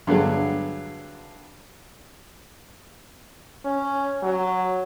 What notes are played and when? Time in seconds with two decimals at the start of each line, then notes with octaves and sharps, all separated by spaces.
0.07 G2 D3 F#3 G#3
3.65 C#4
4.23 F#3